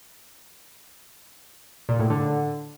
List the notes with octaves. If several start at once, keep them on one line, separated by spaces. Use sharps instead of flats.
A#2
A2
D3